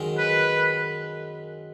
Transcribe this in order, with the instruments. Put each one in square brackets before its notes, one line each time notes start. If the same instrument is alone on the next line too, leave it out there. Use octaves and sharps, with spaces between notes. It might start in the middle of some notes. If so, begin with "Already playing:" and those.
Already playing: [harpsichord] F#2 D#3 G#3
[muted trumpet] B4